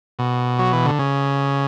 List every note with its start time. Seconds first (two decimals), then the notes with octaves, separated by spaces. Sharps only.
0.19 B2
0.59 F#3
0.73 E3
0.85 D3
0.99 C#3